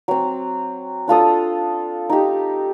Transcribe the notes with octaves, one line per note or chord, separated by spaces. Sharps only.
F#3 C4
D4 F4 A4 D#6
D#4 G4